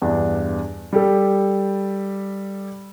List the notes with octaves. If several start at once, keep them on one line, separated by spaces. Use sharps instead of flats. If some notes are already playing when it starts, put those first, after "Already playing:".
E2 G2 D4
G3 G4 A4